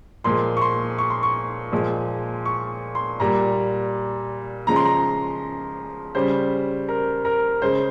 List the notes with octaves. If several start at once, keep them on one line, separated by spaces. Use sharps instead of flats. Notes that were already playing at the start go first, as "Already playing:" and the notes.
A#2 F3 G#3 C6
C#6
C6
C#6
C6
C#6
A#2 F3 G#3
C#6
C6
A#2 G3 A#5
C#3 F3 G#3 A#5
C6
A#5
C#3 G3 C5
A#4
A#4
C#3 G#3 C5